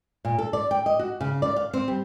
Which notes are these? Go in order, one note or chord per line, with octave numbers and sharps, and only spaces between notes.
A#2
A4
D5
G5
D#5
F#4
C#3
D5
F5
C4
G3